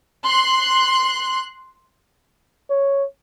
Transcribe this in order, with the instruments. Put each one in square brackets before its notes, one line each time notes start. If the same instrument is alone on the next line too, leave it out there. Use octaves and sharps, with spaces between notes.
[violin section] C6 F#6
[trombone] C#5